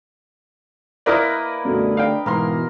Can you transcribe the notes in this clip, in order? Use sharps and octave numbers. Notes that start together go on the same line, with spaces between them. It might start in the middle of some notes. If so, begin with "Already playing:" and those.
A#3 E4 A#4 B4 D5 D#5
F#2 B2 D3 G3 A3
D4 D5 F5 G5
G#2 B2 E3 A#3 A#4 C6